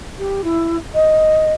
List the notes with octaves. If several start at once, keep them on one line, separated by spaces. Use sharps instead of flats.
G4
E4
D#5